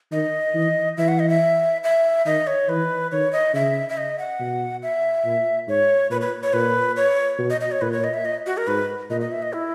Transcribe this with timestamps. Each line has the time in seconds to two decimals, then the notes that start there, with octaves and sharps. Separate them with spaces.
0.12 D#3 D#5
0.54 E3
0.97 E3 E5
1.08 F#5
1.19 D#5
1.29 E5
1.84 E5
2.26 D#3 D#5
2.47 C#5
2.69 E3 B4
3.12 D#3 C#5
3.33 D#5
3.54 C#3 E5
3.89 E5
3.97 D#5
4.19 F#5
4.40 B2
4.83 E5
5.25 A#2
5.68 G#2 C#5
6.10 A#2 B4
6.21 B4
6.43 C#5
6.53 A#2 B4
6.97 C#5
7.39 B2
7.50 D#5
7.61 D#5
7.72 C#5
7.81 A#2 B4
7.93 C#5
8.04 D#5
8.14 E5
8.25 D#5
8.46 F#4
8.57 A#4
8.67 G#2 B4
9.10 A#2 D#5
9.21 D#5
9.32 E5
9.42 D#5
9.53 E4